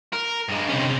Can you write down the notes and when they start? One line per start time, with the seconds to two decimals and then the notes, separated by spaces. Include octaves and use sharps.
0.13 A#4
0.49 G2 G#3
0.69 C3 C#4